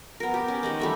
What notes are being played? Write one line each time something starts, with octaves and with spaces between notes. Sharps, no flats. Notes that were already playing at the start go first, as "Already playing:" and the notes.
B3 A#4
G4
C#4
D#3 G#3 D#5
G3 A3 E5